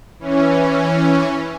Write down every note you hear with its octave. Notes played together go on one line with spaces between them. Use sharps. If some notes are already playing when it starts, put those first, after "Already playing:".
E3 C#4